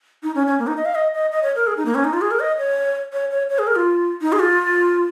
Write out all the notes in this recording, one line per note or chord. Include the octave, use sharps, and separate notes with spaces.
D#4
C#4
C#4
A#3
D#4
D#5
F5
D#5
D#5
D#5
C#5
A#4
G#4
D#4
A#3
C#4
D#4
F4
G#4
A#4
D#5
C#5
C#5
C#5
C#5
G#4
A#4
F4
D#4
G#4
F4